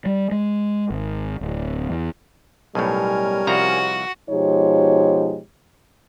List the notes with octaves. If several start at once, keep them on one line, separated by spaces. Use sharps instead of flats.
G3
G#3
G#1
D1
E2
B1 A2 G3 C#4 A#4 G#5
C2 F3 F#4 A#5
B2 F3 G#3 D#4 G4 C#5